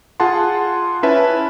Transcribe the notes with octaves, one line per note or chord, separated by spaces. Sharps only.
F4 G#4 F#5 A5 C6
C#4 E4 B4 E5 A5